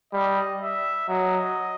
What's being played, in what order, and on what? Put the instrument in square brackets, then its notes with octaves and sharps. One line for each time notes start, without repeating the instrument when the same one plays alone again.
[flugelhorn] G3 [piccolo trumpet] D#5
[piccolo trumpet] E5
[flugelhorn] F#3 [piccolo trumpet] D#5